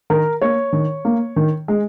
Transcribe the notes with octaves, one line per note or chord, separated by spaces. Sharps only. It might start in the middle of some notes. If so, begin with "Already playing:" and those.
D#3 A#4
A#3 C#5
D#3
A#3
D#3
G#3